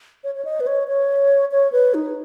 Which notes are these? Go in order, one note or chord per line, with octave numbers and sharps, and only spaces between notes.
C#5
C#5
D#5
B4
C#5
C#5
C#5
B4
D#4